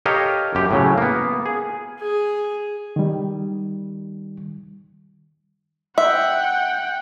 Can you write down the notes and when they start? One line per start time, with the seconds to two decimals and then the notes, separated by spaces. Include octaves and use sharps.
0.06 G4 A4 A#4 C#5 D#5 F5
0.55 F#2 G4
0.71 A2 C#3 F#3
0.98 A#3 B3
1.46 G#4
1.99 G#4
2.96 D#3 G3
5.98 E5 F#5 G5